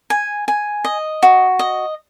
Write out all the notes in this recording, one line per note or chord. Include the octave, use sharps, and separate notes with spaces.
G#5
G#5
D#5
F#4
D#5